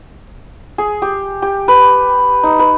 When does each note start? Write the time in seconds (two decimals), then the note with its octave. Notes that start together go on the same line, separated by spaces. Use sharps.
0.78 G#4
1.02 G4
1.42 G4
1.68 B4
2.43 D#4
2.59 B4